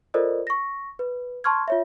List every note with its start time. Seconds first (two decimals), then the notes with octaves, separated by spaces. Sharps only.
0.14 F4 A4 A#4 C5 D5 D#5
0.47 C#6 A#6
0.99 B4
1.44 A5 C6 C#6 F6 G#6
1.68 F4 C#5 E5